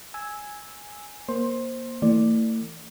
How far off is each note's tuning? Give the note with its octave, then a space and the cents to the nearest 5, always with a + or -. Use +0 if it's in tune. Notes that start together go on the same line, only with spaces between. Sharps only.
G#5 +0 E6 -10
A#3 +20 C5 +10 C6 +20
E3 +0 A3 +40 D5 +0